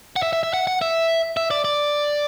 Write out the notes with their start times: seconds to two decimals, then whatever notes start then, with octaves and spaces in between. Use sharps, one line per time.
0.16 F#5
0.23 E5
0.33 E5
0.43 E5
0.54 F#5
0.67 F#5
0.81 E5
1.37 E5
1.51 D5
1.65 D5